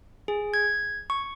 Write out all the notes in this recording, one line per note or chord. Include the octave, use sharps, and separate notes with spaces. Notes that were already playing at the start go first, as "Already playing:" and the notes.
G#4
G#6
C#6